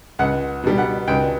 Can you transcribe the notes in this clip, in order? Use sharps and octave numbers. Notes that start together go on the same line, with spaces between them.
C#2 F#5
B2 G3
F#5
C#2 G5